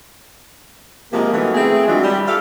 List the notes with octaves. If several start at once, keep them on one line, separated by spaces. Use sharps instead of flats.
C3 F3 G#3 A#3
D#3 E3 F#3 A3 B3
A3 C4 E4 G#4
D#3 E3 F#3 G#3 D4 F4
G3
F4 G4 A4 E5 F5